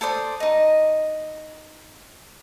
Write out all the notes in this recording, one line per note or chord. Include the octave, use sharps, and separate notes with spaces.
A4 C5 D5 D#6
D#4 D#5